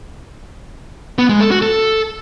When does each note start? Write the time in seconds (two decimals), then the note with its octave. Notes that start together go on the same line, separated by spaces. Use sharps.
1.18 B3
1.29 G#3
1.40 A4
1.51 F#4
1.62 A4